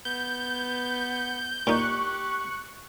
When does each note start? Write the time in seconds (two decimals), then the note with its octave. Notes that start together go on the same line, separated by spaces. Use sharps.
0.05 B3 G6
1.67 A#2 D#4 G4 C#6 F#6